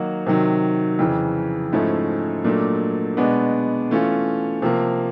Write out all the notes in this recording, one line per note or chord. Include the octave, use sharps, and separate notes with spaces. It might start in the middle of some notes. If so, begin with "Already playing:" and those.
Already playing: D#3 F#3 A#3 D#4 F#4
C3 D#3 F#3
F2 C#3 E3
G#2 F3 A3 C#4 E4
A#2 F#3 A3 D4
B2 G#3 B3 D4
E3 A3 C#4 F4
C3 F3 A#3